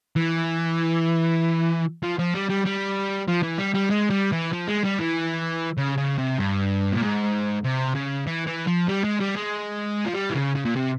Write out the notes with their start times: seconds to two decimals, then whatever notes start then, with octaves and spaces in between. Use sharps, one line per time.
0.16 E3
2.03 F3
2.19 F3
2.35 G3
2.50 G3
2.66 G3
3.28 F3
3.43 E3
3.58 G3
3.74 G3
3.90 G#3
4.10 G3
4.32 E3
4.53 F3
4.67 G#3
4.84 G3
4.99 E3
5.78 C#3
5.98 C#3
6.18 C3
6.39 G2
6.93 A#2
7.02 G#2
7.65 C3
7.95 C#3
8.27 E3
8.47 E3
8.68 F3
8.88 G3
9.04 G#3
9.20 G3
9.36 G#3
10.05 F3
10.14 G3
10.30 E3
10.35 C#3
10.56 C#3
10.65 A#2
10.76 C3